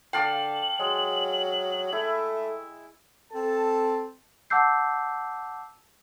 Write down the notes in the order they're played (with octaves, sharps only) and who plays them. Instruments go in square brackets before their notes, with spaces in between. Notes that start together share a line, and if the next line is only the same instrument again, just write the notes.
[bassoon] D3 [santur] F5 A5 D6 [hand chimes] G5 [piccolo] F#7
[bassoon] F#3 [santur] G#3
[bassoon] A3 [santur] E4
[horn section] C4 A4 A5
[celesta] F#5 A5 D6 E6 G6 C7